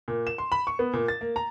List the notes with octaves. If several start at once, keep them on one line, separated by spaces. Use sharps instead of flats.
A#2
E7
C6
B5
C#6
B3
A#2
A6
A#3
A#5